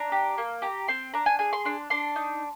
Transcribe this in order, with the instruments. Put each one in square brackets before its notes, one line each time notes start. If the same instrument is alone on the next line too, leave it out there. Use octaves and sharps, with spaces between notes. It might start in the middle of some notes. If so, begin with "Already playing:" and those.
Already playing: [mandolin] D4 A#5
G4
A#3
G4 A#5
C4 C6
D4 A#5
G#5
G#4 G#5
C6
D4 C6
D4 C6
D#4